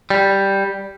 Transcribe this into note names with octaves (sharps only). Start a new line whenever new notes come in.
G3